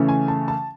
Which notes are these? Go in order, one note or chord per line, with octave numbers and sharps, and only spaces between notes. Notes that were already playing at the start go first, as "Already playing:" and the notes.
Already playing: C#3 E3 A3 C#4
G#5
A5
A5